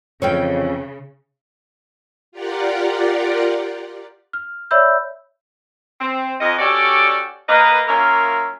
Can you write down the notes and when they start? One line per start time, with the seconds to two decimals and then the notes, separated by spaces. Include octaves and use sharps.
0.22 F2 C#3 E3 C#4 C#5 G5
2.32 F4 G4 A#4 D5 F#5
4.33 F6
4.71 C#5 D5 E5 B5 E6 G6
6.00 C4
6.40 F2 D#5
6.59 C#4 F#4 G4 A4 D5
7.48 A#3 B4 D#5
7.88 F#3 A#3 C#4 F4 A#4 E5